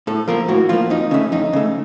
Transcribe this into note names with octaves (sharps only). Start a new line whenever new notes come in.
A2 A4
F3 A#3 A#4
A2 F#4
F3 A#3 F4
F2 D#4
C#3 A3 C#4
F2 D#4
C#3 A3